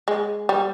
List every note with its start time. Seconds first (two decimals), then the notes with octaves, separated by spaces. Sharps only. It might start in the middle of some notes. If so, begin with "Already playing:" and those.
0.08 G#3
0.49 G3